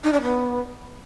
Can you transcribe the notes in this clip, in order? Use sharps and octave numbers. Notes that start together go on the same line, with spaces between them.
D#4
D4
B3